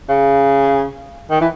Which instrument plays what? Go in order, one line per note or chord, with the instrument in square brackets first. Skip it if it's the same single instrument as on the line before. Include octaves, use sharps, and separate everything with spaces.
[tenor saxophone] C#3
D#3
E3